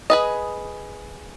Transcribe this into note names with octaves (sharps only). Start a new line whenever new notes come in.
G#4 B4 D#5